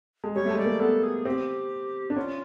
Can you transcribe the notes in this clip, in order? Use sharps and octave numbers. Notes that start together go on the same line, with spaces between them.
G#3
G3 C#5
A3
G#3
D5
A#3
B3 A4
G#4
C4 G4
D4
C#4 F4